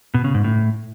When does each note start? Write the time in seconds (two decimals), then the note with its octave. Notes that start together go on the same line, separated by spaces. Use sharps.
0.14 B2
0.24 C#3
0.34 G#2
0.44 A2